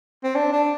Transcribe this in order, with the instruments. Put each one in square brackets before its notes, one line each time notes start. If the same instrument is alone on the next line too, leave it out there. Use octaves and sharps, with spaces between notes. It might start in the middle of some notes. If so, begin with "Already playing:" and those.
[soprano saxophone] C4
D4
D4